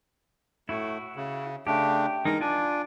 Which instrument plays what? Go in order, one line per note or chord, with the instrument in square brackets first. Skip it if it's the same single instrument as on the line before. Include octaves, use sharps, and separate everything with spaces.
[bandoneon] A2 A3 [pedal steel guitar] E4 F#4
[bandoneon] C#3
[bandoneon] C#3 A3 D4 [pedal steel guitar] G4
[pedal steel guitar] E3 G#3 D#4 [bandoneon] A#4
[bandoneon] D4 [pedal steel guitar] F4 D5 G#5